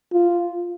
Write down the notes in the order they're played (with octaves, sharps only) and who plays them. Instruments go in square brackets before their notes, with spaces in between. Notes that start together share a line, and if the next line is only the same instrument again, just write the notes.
[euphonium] F4